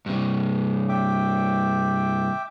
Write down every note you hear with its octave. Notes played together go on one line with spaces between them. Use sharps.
G2 C3
E5 G5 D6